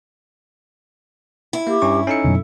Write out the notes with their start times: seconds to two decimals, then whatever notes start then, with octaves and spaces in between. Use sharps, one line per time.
1.53 E4
1.67 A#3 G4
1.82 G2 C#4 C#6
2.07 C#4 D#4 A4 C#7
2.24 F#2 B2 D3